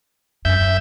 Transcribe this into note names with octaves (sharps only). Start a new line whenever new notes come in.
F#2 E5 G6